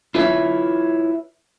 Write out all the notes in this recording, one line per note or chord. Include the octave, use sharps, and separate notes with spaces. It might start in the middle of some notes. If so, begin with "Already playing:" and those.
E4 F4 B4 C#5 E5